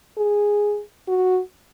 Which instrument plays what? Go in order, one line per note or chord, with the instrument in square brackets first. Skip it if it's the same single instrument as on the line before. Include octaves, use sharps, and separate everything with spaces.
[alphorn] G#4
F#4